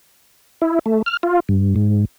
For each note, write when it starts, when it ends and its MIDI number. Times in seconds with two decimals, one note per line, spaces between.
0.62 0.79 64
0.86 1.02 57
1.06 1.17 89
1.23 1.40 65
1.49 1.75 43
1.76 2.05 44